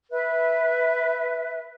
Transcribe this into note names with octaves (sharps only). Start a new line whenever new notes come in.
B4 E5